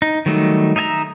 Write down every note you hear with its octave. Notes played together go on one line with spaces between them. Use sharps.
D#4
D#3 F#3 G3 A3 D#4
D#4 D#5 E5 G#5 A#5